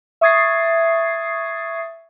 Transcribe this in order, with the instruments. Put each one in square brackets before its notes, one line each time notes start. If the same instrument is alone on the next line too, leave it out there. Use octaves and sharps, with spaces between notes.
[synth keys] E5 C#6 D#6 G#6 A6 C7